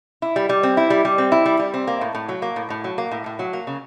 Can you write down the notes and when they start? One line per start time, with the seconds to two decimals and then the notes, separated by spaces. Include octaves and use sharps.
0.22 E4
0.36 G3
0.49 G3
0.63 C4
0.77 E4
0.90 G3
1.05 G3
1.18 C4
1.32 E4
1.46 G3
1.59 G3
1.74 C4
1.88 A#3
2.01 A2
2.15 A2
2.29 F#3
2.42 A#3
2.56 A2
2.70 A2
2.84 F#3
2.98 A#3
3.11 A2
3.26 A2
3.39 F#3
3.53 A#3
3.67 C#3